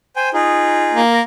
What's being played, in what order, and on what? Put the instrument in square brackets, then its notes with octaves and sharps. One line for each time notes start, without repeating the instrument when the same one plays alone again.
[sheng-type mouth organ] C5 G5 G#5
D#4 F4 G#4
[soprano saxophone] A#3
[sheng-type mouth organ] A#4